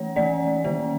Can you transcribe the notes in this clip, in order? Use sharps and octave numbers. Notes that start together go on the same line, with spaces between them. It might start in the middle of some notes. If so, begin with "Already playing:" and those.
Already playing: E3 A3 C#4 C#5
E3 A3 C#4 D5
D#3 G3 A#3 C#4